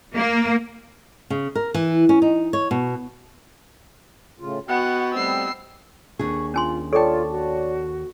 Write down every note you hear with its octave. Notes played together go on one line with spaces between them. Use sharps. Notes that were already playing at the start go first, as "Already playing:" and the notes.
A#3
C#3
A#4
E3
C#4
D#4
C#5
B2
A2 C#3 F4
B3 F#4 D#5 F#5 G5
G3 A3 C4 E6 C7
D#2 D4 G#4 C#6
C#4 F4 G#5 C6
F4 A4 C#5 D5 G5 A5
F#4